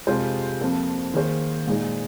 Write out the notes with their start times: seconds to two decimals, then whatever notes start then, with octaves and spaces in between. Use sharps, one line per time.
0.07 F2 C3 G#3 F4 C5
0.61 F2 F3 A#3
1.14 D#3 A#3 G#4 C5
1.67 A#2 G#3 D#4